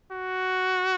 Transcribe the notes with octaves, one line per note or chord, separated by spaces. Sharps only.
F#4